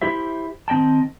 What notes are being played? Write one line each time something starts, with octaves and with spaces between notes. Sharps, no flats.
E4 G4 C5 E5
D#3 C4 D#5 G5 A5